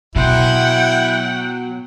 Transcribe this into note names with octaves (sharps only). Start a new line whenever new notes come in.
B2 F#3 E4 F#5 G5 C6